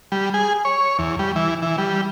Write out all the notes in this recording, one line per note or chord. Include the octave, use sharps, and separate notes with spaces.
G3
G#4
C#5
E2
G3
E3
E3
G3